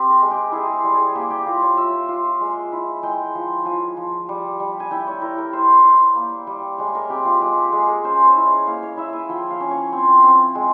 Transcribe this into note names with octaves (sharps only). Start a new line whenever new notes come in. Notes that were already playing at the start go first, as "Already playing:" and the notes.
Already playing: C4 G4
A#4
G#3
G4
E4 G#4
C5
G3
G#4
A#3 G4
G4
F4 A#4
C#5
F4 E5
F4
G#3
E4
G#3 G5
F3
F3 G#5
F3
G3
G3
G#5
E4 G5
C#5
E4 A#4
A#4
E4 C5
E4
A#3
G3
G#3 C#5
A#4
C4 G4
F4
G#3 G4
G4
G#3 G#4
A#4
C#4 C5
C5
E4
C#5
A#3 F5
C#5
E4 E5
G#5
F3 G5
F5
C#4
C#5
C4
C4
G#3